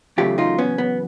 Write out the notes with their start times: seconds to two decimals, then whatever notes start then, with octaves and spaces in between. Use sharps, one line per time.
0.18 E2 C#3 F#3 A3 F4 G4
0.38 D#4 F4
0.58 B3 C#4
0.78 B3